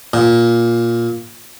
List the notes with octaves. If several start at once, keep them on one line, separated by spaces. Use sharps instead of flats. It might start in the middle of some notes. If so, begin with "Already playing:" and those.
A#2